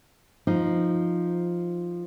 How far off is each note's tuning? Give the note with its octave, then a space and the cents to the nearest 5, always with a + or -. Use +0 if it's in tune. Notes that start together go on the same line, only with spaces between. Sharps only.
F3 +0 D#4 +0